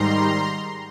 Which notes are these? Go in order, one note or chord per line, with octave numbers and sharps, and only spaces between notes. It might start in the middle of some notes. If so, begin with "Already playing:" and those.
Already playing: G#2 D#3 G3 A#5 C6